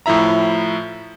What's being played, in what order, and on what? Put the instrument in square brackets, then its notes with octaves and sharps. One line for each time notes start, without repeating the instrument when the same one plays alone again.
[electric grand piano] A2 F3 E4 E5 A#5